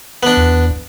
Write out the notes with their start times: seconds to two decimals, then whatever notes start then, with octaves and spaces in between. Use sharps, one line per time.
0.23 B3 D4
0.37 E2